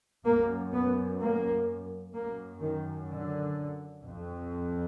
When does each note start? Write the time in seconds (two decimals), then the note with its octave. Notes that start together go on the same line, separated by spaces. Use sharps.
0.25 F#2 A#3
0.73 B3
1.20 A#3
2.14 F#2 A#3
2.61 D#3
3.09 D3
4.03 F2